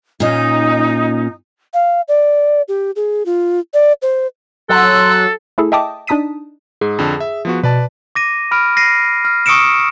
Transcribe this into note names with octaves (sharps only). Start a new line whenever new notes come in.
A#2 C#4 D#4
F5
D5
G4
G#4
F4
D5
C5
F#3 A4 C6 E6 F#6
A3 E4 G#4 A4
D#5 E5 G5 A5 D6 D#6
D4 D#4 A5 D#6 B6 D#7
G#2 G#4
F2 D3
E5
F3 B3 F#4
B2 B4 D5 A5
D6 A#6 D#7
B5 F6 D7
A#6 C7 D#7
F6
C#6 D#6 E6 C#7 D7 E7